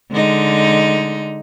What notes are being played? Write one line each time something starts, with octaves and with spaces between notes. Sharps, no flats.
D3 G#3 D#4